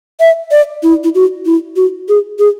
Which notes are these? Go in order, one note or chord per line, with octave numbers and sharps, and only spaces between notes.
E5
D5
E4
E4
F#4
E4
F#4
G#4
G#4